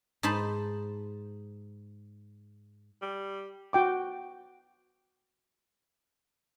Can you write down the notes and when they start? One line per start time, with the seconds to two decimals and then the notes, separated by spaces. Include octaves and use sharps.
0.23 G#2 D#4 C5 A5 B5
3.02 G3
3.73 F#4 G5 D6